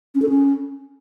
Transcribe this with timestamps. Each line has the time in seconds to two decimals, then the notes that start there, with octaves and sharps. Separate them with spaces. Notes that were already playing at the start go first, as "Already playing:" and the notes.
0.15 C#4
0.22 A4
0.29 C#4